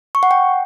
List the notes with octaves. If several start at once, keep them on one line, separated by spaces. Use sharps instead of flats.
C#6
F#5
G5